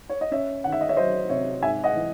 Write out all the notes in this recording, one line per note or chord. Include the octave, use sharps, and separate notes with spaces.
C#5
D#5
C#4 C#5 E5
D#3 F#5
E5
D#5
C#5 E5
F#3 C5 D#5
C3 C#5 E5
G#2 E5 G#5
D#5 F#5
E3